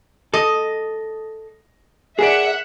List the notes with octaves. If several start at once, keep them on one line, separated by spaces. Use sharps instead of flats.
A4 D#5
G#4 A#4 D5 E5 F#5